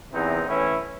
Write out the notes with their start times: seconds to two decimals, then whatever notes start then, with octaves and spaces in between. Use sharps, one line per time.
0.12 E2 C3 E3 C4 D#4
0.47 A2 E3 C#4 E4